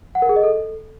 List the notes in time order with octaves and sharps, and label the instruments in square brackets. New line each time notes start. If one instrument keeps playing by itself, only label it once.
[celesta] F#5
A#4
G#4
D#5
A4